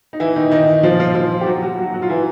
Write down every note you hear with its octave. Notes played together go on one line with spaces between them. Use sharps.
D#4
E3 E4
D#3 D#4
D#3 D#4
F3 F4
F3 F4
F3 F4
G4
F#3 F#4
F#3 F#4
F#3 F#4
F#3 F#4
F4
E3 E4